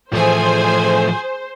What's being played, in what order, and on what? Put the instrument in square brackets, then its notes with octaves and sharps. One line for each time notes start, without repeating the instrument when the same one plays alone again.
[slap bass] A2 E3 [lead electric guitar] F3 A3 [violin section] G#4 G#5 [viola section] C5